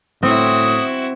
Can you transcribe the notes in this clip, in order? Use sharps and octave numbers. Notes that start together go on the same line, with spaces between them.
A2 C4 E4 F#4 D#6